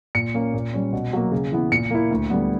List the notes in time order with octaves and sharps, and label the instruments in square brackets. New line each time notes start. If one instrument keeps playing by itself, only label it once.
[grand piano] A#2 C#7
A#3 C#4
A#2
G3 C#4
B2
F#3 A#3
C#3
E3 B3 E4
A#2 C#7
A#3 E4
D2
D3 G3 B3